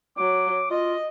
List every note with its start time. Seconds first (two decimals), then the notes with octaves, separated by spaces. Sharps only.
0.18 F#3 D6
0.71 F4 D#5